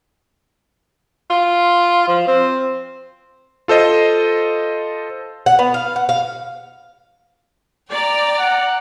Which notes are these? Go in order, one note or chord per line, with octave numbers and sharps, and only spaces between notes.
F4
F3
C4
F4 A4 C5 D#5
F#5
B3
F5
F#5
F5
D5 G5 A#5
F#5